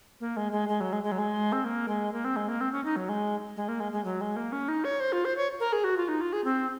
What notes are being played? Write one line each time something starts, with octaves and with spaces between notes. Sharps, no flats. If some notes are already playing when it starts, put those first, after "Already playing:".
A#3
G#3
G#3
G#3
F#3
G#3
G#3
F#3
G#3
C4
A#3
G#3
A#3
C4
G#3
A#3
C4
C#4
D#4
F#3
G#3
G#3
A#3
G#3
G#3
F#3
G#3
A#3
C#4
D#4
C#5
C5
F4
C5
C#5
A#4
G#4
F#4
F4
D#4
F4
G#4
C4